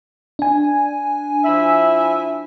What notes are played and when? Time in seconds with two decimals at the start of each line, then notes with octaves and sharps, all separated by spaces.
0.39 D4 G#5
1.44 F3 E4 E5